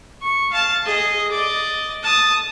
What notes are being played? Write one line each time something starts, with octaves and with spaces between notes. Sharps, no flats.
C#6
F5 A5
G#4 D#5
D5 D#5
A5 D#6